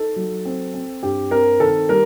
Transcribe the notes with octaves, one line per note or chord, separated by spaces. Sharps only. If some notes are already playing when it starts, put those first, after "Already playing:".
Already playing: D#4 A4
F#3
C4
C4
G2 G4
C4 A#4
D#3 A4
G3 A#4